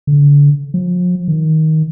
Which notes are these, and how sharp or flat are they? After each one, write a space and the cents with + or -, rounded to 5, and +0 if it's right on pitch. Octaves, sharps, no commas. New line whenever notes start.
D3 -35
F3 +40
D#3 +15